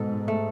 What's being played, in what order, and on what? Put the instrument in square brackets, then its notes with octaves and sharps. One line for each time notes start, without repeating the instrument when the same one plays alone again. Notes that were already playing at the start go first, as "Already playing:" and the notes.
Already playing: [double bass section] G#2 [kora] B2 A4
[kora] A3